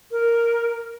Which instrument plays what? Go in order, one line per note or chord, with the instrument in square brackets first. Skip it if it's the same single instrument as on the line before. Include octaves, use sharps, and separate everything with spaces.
[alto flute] A#4